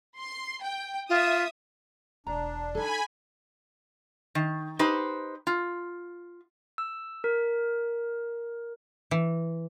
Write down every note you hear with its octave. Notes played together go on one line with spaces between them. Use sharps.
C6
G5
F4 E5 D#6
E1 D4 A#5
D#4 A4 G#5 B5
D#3
D#4 G4 B4 C5
F4
E6
A#4
E3